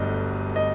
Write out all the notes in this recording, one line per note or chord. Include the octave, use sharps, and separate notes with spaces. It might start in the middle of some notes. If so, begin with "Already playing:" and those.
Already playing: G1 G2 F#3 A3 D#5
D#5